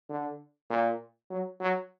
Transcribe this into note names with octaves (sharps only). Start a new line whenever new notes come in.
D3
A#2
F#3
F#3